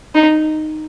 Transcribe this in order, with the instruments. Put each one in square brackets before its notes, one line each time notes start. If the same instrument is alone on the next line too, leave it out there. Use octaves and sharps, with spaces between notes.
[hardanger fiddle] D#4